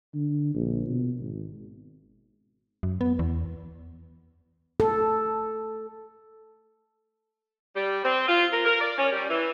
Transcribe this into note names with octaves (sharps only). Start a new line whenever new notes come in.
D3
A#1
B2
G#1
F#2
B3
E2
A4
G3
C4
F4
A#4
A#4
D5
C#4
G3
E3